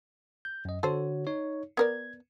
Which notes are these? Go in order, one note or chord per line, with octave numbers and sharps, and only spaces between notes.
G6
F#2 D#5
D3 F#4 A4 C5 C#5
D#4 C#5
B3 A#4 D5 G#6